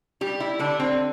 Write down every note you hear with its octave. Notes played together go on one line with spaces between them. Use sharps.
G3 G4
E4
D3 D4
C4